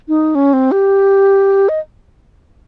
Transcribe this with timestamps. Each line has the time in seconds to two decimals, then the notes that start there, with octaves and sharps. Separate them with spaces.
0.08 D#4
0.35 C#4
0.53 C4
0.72 G4
1.69 D#5